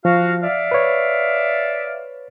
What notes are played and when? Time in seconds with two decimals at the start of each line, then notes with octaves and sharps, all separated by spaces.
0.05 F3 F#4 F5
0.42 D5 E5 F5
0.71 B4 C#5